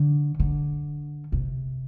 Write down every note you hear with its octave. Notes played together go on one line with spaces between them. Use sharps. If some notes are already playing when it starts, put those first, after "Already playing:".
Already playing: D3
D3
C3